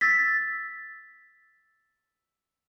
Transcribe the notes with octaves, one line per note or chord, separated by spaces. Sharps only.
E6 A6 B6